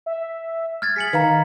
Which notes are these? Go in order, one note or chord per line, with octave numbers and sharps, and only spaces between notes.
E5
F6 G#6 A6
G#4 B6 C#7 F#7
D#3 B4 F5 A#5